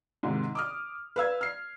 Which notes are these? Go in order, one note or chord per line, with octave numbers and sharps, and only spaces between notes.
G#2 C3 D#3
D6 D#6 F6
B4 F5 E6 G#6
F6 C7